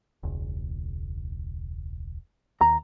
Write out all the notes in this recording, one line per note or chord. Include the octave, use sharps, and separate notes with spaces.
E1 C#2
D#2 A#5